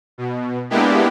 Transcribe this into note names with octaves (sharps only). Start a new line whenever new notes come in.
B2
G#3 A#3 B3 D4 E4 G4